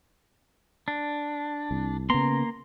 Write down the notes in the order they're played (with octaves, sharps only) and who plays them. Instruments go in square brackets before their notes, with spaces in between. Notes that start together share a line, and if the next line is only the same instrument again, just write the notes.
[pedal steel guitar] D4
[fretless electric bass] C2
[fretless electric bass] C#3 B3 [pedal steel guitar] A#3 A#5 C6